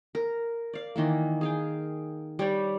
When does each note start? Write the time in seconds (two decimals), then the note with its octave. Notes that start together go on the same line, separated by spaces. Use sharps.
0.15 A#4
0.73 D5 F5
0.96 D#3 E3 A#3
1.41 G#4 F5 G5
2.39 G3 C#5 G5 B5